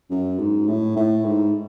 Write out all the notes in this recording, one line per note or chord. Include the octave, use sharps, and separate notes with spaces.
F#2
G#2
A2
A2
G#2